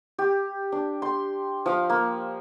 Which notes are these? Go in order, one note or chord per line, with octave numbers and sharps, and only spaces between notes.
G4
D4
C6
F3 F5
A#3